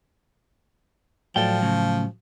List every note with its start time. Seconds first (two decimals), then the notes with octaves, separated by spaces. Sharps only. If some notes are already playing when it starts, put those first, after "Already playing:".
1.36 A2 F3 F#3 A4 D5 G5
1.62 C#3 A3